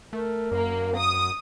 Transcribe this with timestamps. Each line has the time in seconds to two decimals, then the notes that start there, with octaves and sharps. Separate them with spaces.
0.13 A3 A#4
0.52 F#2 A#3
0.97 D#6